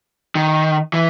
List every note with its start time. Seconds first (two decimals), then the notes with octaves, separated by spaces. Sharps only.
0.35 D#3
0.93 E3